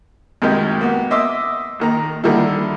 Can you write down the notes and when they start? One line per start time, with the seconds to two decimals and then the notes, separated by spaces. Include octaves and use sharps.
0.42 C2 F#2 D#3 G#3 G4
0.81 A#3 B3
1.11 D#5 E5 C6 D6 E6
1.79 A#1 D#3 A#5
2.24 D3 D#3 F3 G3 E4